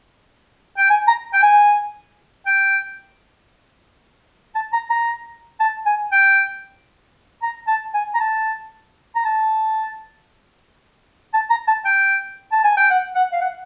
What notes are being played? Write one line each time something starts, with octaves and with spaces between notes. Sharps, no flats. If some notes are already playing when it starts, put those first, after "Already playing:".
G5
G#5
A#5
G5
G#5
G5
A5
A#5
A#5
A5
G#5
G5
A#5
A5
G#5
A#5
A5
A#5
A5
A5
A#5
A5
G5
A5
G#5
G5
F#5
F#5
F5
F#5